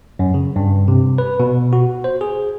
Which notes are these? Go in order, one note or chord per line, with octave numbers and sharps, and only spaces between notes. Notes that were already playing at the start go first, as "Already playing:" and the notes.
F#2
C#3
G2
C3
B4
B2
F#4
C5
G#4